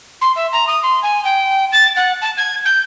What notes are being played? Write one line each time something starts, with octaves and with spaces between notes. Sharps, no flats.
C6
E5
A#5
D#6
C6
G#5
G5
A6
F#5
A5
G#6
G6